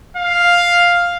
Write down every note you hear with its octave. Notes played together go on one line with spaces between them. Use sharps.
F5